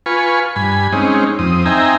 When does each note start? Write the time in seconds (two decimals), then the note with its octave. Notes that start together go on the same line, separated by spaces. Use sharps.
0.06 F4 B4 G#5 C#6
0.56 G2 G#5 B5
0.93 G#3 C4 C#4 D#4
1.39 F2 C4 D#6
1.66 C4 D#4 E5 G5 G#5 A#5